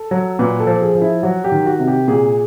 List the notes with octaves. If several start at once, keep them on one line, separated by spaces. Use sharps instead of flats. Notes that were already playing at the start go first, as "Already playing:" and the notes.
Already playing: A4
F#3
A#2 B4
A4
F3
G#4
F3
E4
F#3 F#4
G4
D#3
F#4
C3
G4
A#2 G#4